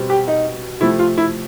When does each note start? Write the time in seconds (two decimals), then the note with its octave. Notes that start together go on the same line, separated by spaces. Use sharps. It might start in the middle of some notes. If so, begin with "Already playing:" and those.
Already playing: B2 G3 C4
0.10 G4
0.28 D#4
0.81 C3 F3 A3 E4
0.99 F4
1.18 E4